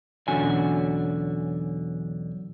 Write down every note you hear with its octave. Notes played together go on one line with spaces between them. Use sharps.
B1 E2 D3 C#4 F#4 G#5